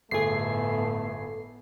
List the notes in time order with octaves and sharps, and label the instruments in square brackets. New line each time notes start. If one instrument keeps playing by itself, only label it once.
[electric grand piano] G1 G#4 G#5 [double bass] A2 B3 [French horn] A3 [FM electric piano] A4 C7